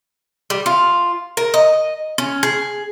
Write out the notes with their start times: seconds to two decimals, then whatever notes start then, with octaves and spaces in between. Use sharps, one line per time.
0.50 G3
0.66 F4
1.37 A#4
1.54 D#5
2.18 C#4
2.43 G#4